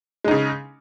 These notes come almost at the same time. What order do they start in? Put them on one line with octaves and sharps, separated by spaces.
G#3 D#4 C#3